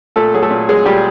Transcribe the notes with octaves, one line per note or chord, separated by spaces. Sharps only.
A#2 A3 A4
F#3 G#4
A3 A4
A#2
F#3 G#3 G#4
A#2 G3 G4